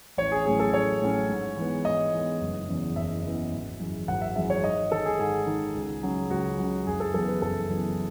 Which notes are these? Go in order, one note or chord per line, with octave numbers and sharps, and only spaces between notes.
A1 C#5
G#4
A2 F#3 C#4 G#4
A4
A1 C#5
A2 F#3 C#4
G#2
E3 G#3 B3
G#2 D#5
E3 G#3 B3
F#1
E2 C#3 E3 B3
F#1 E5
E2 C#3 E3 B3
G#1
F#2 E3 G#3
G#1 F#5
E5
F#2 E3 G#3 E5
C#5
G#2 D#5
D#3 G#3 A4
G#4
G#2 G#4
D#3 G#3
C#2
C#3 F#3
C#2 F#4
C#3 F#3
F#1 G#4
A4
F#2 E3 B3 A4
B4
F#1 A4
F#2 E3 B3